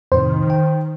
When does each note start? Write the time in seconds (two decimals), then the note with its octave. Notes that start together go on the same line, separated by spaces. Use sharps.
0.12 F2 A2 C3 D#3 C5
0.50 G5